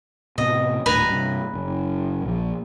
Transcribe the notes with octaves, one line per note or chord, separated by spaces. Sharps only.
A2 C3 B3 D#5
D#1 A2 D4 B4 G#5 A#5
G2 C3
F#1 F#2
A#1 F3